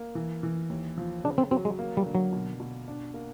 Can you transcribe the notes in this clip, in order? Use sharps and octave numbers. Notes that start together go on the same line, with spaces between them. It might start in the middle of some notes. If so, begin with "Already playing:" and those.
Already playing: A#3
E3
E3
D#2
F3
C#3 D4
C4
F#3 C4
G#3
A#3
G3
D3
F#3
B2
B2
D4
A#3